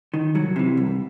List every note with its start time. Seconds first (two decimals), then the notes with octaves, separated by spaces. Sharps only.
0.14 D#3
0.35 C2 F#3
0.56 C3 E3
0.77 C2